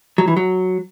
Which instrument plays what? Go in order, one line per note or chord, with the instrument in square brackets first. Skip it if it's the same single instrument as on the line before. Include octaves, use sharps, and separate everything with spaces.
[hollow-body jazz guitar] F#3
E3
F#3